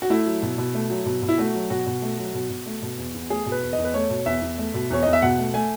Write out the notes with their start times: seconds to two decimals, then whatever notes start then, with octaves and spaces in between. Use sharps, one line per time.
0.02 F#4
0.10 A3 E4
0.26 F#3
0.43 B2
0.58 B2
0.74 A3
0.90 F#3
1.06 B2
1.22 B2
1.29 E4
1.38 A3 F#4
1.54 F#3
1.70 B2 F#4
1.87 B2
2.02 A3
2.18 F#3
2.34 B2
2.50 B2
2.66 A3
2.82 B2
2.98 E2
3.14 E2
3.30 A3 G#4
3.46 B2
3.52 B4
3.63 E2
3.73 D#5
3.78 E2
3.84 B4
3.94 A3 C#5
4.10 B2
4.26 E2 E5
4.42 E2
4.58 A3
4.74 B2
4.90 E2 C#5
5.03 E2 D#5
5.13 E5
5.22 B2 F#5
5.38 A3
5.54 A3 G#5